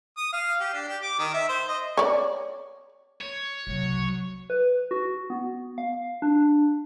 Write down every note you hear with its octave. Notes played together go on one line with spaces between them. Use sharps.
D#6
F5
G4
D4
G4
D6
D#3
E5
C5
D#5
C#5 D5
C#5
F#1 C2 F#3
B4
F#4
B3
F5
D4